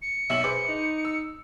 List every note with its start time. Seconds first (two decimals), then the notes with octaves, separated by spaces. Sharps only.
0.02 C#7
0.30 B1 B2 E5 F#7
0.44 G#4 B4 C5 D6
0.69 D#4
1.05 E6